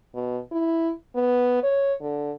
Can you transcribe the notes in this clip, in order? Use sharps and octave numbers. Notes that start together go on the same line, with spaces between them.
B2
E4
B3
C#5
D3